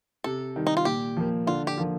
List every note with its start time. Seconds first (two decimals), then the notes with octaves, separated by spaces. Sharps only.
0.24 C3 A4
0.56 D#3 G3
0.67 D#4
0.77 F4
0.85 A#2 G4
1.17 F3 A#3
1.47 D3 F4
1.67 G4
1.77 F3 A#3 F4